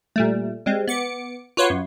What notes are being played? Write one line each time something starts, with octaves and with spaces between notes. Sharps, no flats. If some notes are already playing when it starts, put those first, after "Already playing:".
A#2 G3 A3
G3 G#3 C4
B3 D6 C#7
F4 F#4 B4 C#5 C6 C#6
F#2